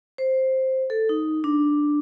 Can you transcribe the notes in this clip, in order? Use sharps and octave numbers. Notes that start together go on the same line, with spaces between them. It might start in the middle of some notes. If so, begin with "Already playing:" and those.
C5
A4
D#4
D4